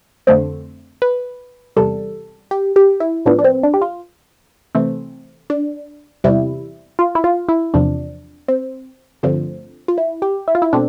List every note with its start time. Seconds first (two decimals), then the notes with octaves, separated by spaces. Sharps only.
0.27 F2 D3 A3 C4
1.02 B4
1.76 E2 C3 G3 A4
2.51 G4
2.76 G4
3.00 E4
3.26 A2 F3 B3 D4
3.39 D4
3.44 C4
3.63 D4
3.74 G4
3.81 F4
4.75 C3 E3 A3 C4
5.50 D4
6.24 E2 C3 G3 E4
6.99 F4
7.15 E4
7.24 F4
7.49 E4
7.74 E2 C3 F3 D4
8.48 C4
9.23 G2 D3 F3 A3 C4
9.88 F4
9.98 E4
10.22 G4
10.48 E4
10.55 F4
10.62 E4
10.73 B2 A3 C4 D4